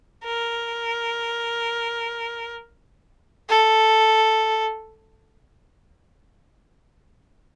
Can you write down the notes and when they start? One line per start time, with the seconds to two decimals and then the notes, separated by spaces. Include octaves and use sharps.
0.24 A#4
3.49 A4